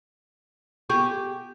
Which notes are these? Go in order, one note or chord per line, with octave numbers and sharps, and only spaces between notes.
B3 G4 G#4 C#6